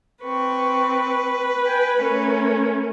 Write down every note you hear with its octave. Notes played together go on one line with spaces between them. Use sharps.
C4 B4 C#6
G5 G#5
A3 C#4 A#4